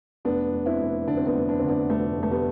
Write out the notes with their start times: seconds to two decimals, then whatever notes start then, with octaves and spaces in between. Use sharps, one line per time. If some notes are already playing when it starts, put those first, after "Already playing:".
0.25 F1 B3 D4
0.52 F1
0.66 C4 E4
0.80 F1
1.07 D3 D4
1.17 C4
1.26 B3 D4
1.35 F1
1.49 D4
1.59 D3 C4
1.68 B3 D4
1.90 F1 A3
2.17 F1
2.23 A3
2.31 G3 B3